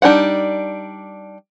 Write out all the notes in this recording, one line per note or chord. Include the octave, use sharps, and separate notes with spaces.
G3 D4 D#4 C#5 F#5